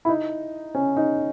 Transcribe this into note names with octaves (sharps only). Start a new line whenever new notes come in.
E4
D#4
C#4
D#4